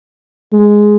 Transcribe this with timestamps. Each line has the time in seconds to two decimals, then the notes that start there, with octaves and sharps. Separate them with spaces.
0.53 G#3